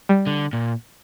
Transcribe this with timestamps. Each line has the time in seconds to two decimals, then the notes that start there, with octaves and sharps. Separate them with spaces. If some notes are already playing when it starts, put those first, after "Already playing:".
0.09 G3
0.27 D3
0.53 A#2